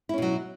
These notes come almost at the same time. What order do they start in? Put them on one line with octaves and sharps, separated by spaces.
E4 C#4 B2 F#3